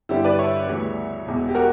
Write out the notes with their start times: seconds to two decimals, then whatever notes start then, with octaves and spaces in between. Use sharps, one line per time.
0.09 G1 G2 D3 G3 E4 G4
0.24 B4 D5
0.39 C#5 E5
0.68 D2 C#3 E3 G3
1.26 E1 E2 B2
1.49 G4
1.55 F#4 A#4